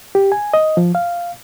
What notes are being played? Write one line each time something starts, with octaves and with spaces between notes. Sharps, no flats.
G4
G#5
D#5
F3
F5